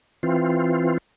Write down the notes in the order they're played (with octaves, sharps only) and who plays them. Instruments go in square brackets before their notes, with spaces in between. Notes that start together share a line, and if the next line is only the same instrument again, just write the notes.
[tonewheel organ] E3 C4 F4